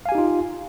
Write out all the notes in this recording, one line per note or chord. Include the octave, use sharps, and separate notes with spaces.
D#4 F4 G4 F5 G#5